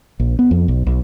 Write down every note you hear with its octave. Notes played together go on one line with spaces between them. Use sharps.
A#1
B3
F2
B1
B1